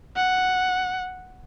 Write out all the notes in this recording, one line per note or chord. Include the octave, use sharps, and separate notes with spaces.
F#5